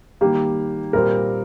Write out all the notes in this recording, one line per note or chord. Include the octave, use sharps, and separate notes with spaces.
D#3 G3 A#3 G4
A#2 G3 C4 F4 A#4